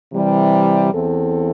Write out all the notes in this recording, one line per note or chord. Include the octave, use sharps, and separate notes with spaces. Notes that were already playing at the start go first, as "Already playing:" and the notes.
C3 E3 G3
E2 E3 C4 A4